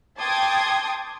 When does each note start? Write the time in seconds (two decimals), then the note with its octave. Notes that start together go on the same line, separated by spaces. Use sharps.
0.19 G5 A5 C6 D6 D#6 G#6